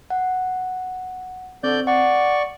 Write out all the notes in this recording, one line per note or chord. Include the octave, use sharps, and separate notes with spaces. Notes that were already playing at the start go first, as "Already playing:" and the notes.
F#5
D3 C4 D5 G6
D5 F#5 C#6